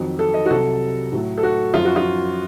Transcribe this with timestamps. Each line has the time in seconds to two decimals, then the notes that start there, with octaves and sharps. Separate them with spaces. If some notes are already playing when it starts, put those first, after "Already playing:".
Already playing: F2 D#3 F#3
0.19 A4
0.34 D#5
0.46 F#4
0.50 C2 C3 F#3 A4
1.12 A2 F#3
1.38 A4
1.43 F#4
1.74 F#2 F3 F4
1.85 F#4
1.96 F4